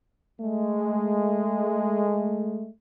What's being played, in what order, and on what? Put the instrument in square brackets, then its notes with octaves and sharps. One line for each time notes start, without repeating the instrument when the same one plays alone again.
[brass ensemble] G#3 A3